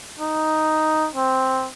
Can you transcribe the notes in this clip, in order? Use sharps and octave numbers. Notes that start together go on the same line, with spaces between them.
D#4
C4